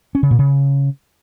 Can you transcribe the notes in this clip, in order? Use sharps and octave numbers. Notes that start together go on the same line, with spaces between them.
C#4
C#3
A#2
C#3